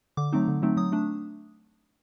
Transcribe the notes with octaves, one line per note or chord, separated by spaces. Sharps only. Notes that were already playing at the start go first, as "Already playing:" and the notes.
D3 D6
F#3 A3 C4 D#4
D3
F#3 A3 C4 D#4
F#3 D#6
A3 D4